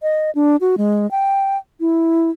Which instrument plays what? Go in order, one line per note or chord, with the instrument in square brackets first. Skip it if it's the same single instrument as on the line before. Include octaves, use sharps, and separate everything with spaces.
[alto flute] D#5
D4
F#4
G#3
G5
E4